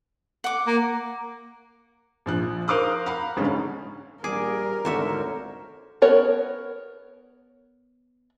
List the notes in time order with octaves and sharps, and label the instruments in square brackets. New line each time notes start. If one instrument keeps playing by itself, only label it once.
[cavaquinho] F#5 D6
[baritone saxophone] A#3
[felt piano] A#1 F3 F#6
A#4 C5 F5 D6 D#6 F#6
F5 F#5 A#5 B5
G1 G#2 D3 C#4
[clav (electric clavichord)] A#1 G#4 [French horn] G3 [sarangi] A#4 [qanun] D6
[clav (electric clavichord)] G#1 D2 D3 [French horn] A4 [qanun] C5 C#5 E5
[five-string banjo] B3 A#4 C#5